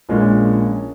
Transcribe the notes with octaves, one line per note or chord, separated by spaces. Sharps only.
A#1 A#2 G#3 C#4